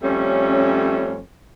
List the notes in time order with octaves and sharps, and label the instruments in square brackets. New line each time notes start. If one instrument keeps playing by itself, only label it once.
[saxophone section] F2 G3 A3 C#4